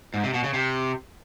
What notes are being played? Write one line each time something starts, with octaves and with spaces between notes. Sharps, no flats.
G#2
C3
B2
C#3
C3